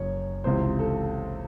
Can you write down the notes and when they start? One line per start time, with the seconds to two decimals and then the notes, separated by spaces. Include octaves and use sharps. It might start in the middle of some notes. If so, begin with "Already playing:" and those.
Already playing: F#1 F#2 C#5
0.44 C#2 C3 E3 C5
0.79 A4